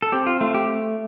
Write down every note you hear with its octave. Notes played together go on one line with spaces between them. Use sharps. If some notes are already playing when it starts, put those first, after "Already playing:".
A4
C4 G4
F4
A3 F4
G4